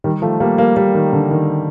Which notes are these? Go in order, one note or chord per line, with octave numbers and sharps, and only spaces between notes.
D#3 G3
F3 A3
G3 A#3
G3 A#3
G3 A#3
D#3
D3
D#3